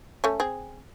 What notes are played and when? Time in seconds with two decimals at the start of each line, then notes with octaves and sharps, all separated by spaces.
0.24 A3 C#4
0.40 C4 G#4